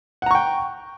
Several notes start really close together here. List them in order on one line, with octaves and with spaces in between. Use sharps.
F#5 A#5 C#6 G5